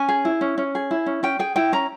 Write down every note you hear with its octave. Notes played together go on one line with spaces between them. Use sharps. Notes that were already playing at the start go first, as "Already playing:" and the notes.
Already playing: C#4 G#5
G#4
E4
C#4
C#4
G#4
E4
C#4
C#4 G5
G#4 G5
E4 G5
C#4 A#5